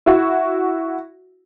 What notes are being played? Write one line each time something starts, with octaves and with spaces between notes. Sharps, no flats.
E4 F#4